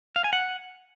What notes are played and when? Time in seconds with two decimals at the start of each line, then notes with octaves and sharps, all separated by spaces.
0.16 F5
0.24 G#5
0.33 F#5